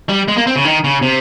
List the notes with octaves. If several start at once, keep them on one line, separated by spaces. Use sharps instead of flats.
G3
G#3
A#3
C4
C#3
D#3
C#3
C3